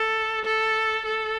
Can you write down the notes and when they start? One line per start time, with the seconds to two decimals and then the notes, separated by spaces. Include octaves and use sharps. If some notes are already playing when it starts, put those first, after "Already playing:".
Already playing: A4
0.45 A4
1.06 A4